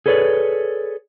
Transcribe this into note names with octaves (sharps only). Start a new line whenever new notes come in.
G#4 A4 B4 C#5 D5